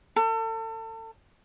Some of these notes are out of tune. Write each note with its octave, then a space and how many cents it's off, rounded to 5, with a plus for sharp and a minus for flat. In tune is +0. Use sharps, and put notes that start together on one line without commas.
A4 +35